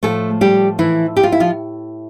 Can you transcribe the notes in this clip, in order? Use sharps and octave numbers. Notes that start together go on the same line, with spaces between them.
A2 F3 A3 A4
G3 G4
E3 E4
G4
F4
E4
F3 F4